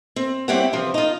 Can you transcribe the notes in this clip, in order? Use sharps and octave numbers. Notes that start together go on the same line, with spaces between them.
C4
G3 C4 E4 G4 C#5 F#5
C3 E3 F3
D#4 F4